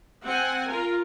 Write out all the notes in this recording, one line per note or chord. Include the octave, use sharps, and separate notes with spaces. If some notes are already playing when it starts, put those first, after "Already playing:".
C4 F#5 G#5
F4 A#4